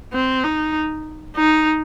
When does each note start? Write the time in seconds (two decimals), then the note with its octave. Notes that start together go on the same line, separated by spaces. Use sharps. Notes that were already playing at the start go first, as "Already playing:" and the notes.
0.13 C4
0.44 D#4
1.36 D#4